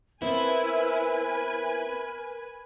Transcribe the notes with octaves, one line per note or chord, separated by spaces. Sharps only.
B3 C4 E4 A#4 B4 G#5